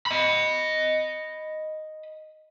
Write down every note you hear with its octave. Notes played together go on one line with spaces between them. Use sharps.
D#5 B5